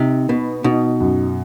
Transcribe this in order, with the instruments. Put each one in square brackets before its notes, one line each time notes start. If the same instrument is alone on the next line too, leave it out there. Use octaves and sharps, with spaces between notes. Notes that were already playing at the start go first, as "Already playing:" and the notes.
Already playing: [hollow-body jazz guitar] C3 [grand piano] D#4
[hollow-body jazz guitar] B2 [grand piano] B3
[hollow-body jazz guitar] B2 [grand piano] D#4
[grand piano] F#2